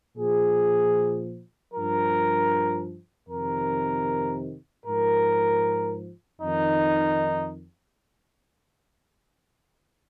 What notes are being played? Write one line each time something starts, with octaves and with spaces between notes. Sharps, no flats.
A#2 F3 G#4
G2 F3 A#4
F2 C3 D#3 A#4
G#2 F3 A#4
F2 D#3 D#4